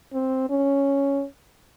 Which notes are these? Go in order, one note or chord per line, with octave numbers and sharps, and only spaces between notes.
C4
C#4